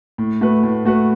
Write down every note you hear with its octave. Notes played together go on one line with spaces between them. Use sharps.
A2
A3 F#4 B4
A2
A3 F#4 B4